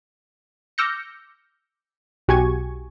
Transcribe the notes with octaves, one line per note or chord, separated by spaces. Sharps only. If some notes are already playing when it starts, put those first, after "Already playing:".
D6 E6 F6 G6 A#6 C#7
B1 F#4 G4 G#5 C#6 G#6